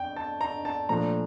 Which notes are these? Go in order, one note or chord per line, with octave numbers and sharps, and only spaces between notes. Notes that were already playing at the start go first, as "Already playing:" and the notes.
Already playing: F2 G5
A5
A#5
A5
A#2 F3 A3 D4 A#5